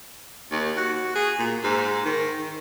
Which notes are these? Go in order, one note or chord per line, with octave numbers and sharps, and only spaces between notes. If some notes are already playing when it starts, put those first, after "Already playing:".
D#2
F#4
G#4
A#2
G#2
D#3
D#3